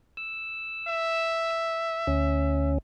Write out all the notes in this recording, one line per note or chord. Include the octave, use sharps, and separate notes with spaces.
E6
E5
D2 C#4